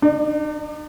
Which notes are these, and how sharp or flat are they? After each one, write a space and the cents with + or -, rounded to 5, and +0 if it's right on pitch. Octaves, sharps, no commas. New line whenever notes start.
D#4 -45 D5 +15